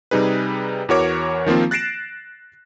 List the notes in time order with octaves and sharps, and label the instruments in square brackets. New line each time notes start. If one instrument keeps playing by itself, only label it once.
[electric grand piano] C3 G3 D#4 G#4 B4
E2 E3 F#4 A#4 C#5 D6
D#3 F3 A#3 C4 F4
F#6 A6 A#6 C7 D7 E7